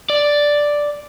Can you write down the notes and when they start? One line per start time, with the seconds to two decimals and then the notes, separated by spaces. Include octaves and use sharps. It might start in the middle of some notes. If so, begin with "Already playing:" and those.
0.10 D5